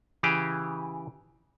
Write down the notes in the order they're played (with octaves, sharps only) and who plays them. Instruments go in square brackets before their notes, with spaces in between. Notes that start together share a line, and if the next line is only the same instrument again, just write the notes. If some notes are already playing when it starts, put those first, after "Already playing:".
[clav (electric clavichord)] C#3 E3 G4 G#4